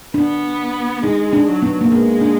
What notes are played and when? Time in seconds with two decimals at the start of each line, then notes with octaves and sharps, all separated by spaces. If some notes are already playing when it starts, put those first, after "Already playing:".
0.14 B3 D4
1.03 G#3 D#4
1.33 D4
1.48 F#3
1.62 B3
1.81 A#3
1.92 G#3 B3
2.21 D4